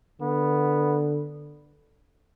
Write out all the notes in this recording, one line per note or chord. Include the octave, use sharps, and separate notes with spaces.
D3 B3